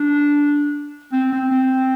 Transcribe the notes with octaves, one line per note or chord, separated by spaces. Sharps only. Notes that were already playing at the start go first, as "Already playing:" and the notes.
Already playing: D4
C4
C4
C4